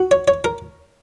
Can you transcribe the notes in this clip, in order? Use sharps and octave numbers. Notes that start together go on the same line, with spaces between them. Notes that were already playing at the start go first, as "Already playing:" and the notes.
Already playing: F#4
C#5
C#5
A#4